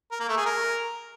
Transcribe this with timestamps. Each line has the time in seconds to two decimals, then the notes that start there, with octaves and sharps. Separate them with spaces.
0.11 A#4
0.20 A#3
0.28 A3
0.37 G#4
0.45 A#4